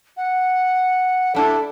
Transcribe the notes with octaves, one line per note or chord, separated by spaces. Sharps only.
F#5
G3 D4 E4 A4